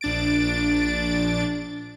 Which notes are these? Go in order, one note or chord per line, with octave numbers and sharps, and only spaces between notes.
A#1 D4 A6 D7